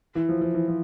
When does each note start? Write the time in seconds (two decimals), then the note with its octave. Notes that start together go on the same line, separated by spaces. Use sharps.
0.15 E3
0.29 F3
0.41 F3
0.54 E3
0.68 F3